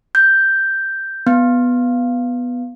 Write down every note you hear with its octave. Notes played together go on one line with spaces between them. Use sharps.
G6
B3